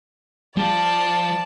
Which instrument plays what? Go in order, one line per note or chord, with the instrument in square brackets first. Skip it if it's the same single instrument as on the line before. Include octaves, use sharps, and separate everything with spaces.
[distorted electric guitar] F3 [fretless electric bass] G3 [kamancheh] D5 A5